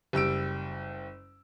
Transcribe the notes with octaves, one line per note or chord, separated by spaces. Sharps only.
F#1 G3 E6 D7